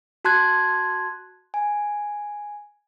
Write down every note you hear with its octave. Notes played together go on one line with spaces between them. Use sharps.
F#4 A5 C6 F#6 G#6
G#5